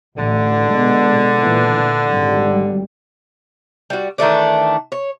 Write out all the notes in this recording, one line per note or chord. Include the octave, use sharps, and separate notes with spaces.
A1 D3
B2 G#3
A#2 E3
G#1 G3
G3 F#4
D#3 E3 A3 D4
C#5